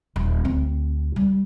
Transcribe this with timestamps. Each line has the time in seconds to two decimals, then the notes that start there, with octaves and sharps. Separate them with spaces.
0.16 D#1
0.45 D2 C4
1.16 G3